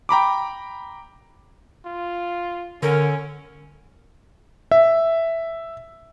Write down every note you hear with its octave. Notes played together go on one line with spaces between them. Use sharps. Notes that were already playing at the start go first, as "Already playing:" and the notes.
G5 A#5 B5 D6
F4
D3 C#4 A#4
E5